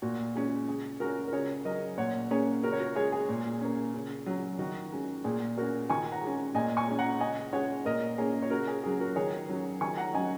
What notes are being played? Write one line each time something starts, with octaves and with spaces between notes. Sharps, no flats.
A#2 F#4
G#3 C#4
C#3 G#4
G#3 C#4 F#4 A#4
A#4
C#3 G#4 C#5
F#3 C#4 A#4 D#5
A#2 C#5 F#5
A#3 C#4 G#4 C#5
C#3 F#4 A#4
C#5
F#4 A#4
G#3 C#4 G#4 C#5
G#4
A#2
A#3 C#4
C#3
F#3 C#4
D#3 F#4
G#3 C#4
A#2 G#4
A#3 C#4 F#4 A#4
D#3 G#5 C#6
F#5 A#5
G#3 C#4
A#2 D#5 G#5
G#5 C#6
G#3 C#4
F#5 A#5
C#3 D#5 G#5
G#3 C#4 C#5 F#5
A#2 A#4 D#5
A#3 C#4 G#4 C#5
C#5
C#3 F#4 A#4
G#4
F#3 C#4 G#4
F#4 A#4
D#3 G#4 C#5
F#3 C#4
D#3 G#5 C#6
F#5 A#5
F#3 C#4 D#5 G#5